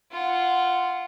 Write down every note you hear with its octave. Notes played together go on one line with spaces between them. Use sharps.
F4 F#5